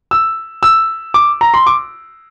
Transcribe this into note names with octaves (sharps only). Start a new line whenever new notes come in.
E6
E6
D6
A#5
C6
D6